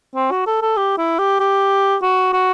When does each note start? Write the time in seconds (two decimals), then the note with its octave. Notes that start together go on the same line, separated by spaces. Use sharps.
0.15 C4
0.31 F#4
0.46 A4
0.62 A4
0.77 G4
0.98 E4
1.18 G4
1.40 G4
2.02 F#4
2.33 F#4